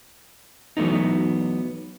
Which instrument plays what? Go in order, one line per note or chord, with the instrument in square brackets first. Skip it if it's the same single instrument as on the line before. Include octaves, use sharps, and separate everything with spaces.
[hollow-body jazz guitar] E3 F#3 A3 B3 D#4